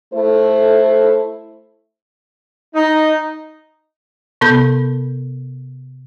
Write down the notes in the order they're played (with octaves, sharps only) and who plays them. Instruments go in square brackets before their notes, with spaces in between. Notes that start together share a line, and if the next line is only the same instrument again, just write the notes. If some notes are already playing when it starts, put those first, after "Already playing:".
[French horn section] A3 E4 A4 C5
[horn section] D#4
[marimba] C3 B3 A4 B5 G6